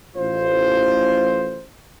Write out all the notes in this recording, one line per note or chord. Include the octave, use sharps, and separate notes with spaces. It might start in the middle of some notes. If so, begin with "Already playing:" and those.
A1 F4 C5